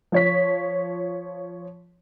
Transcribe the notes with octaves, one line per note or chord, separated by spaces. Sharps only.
F3 C#5 B6